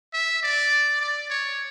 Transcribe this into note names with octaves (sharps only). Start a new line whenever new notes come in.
E5
D5
D5
C#5